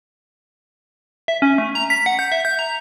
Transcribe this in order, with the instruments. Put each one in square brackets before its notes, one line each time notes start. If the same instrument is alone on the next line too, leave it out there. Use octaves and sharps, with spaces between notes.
[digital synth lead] E5
C#4
A3
A#5
B6
F#5
G6
E5
G6
A#5